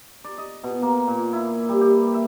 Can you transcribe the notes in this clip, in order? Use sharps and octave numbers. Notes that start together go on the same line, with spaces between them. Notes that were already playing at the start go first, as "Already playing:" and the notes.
D5
D#5
B2
A#3
A#2
E4
G3
G4
E5